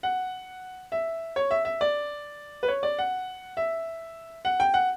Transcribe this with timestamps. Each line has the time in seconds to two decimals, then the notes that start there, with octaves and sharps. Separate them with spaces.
0.03 F#5
0.92 E5
1.36 C#5
1.51 E5
1.65 E5
1.81 D5
2.63 B4
2.68 C#5
2.83 D5
2.98 F#5
3.57 E5
4.45 F#5
4.60 G5
4.74 F#5